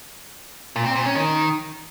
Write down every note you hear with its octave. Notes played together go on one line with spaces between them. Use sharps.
A#2
C4
A#2
C#4
D#3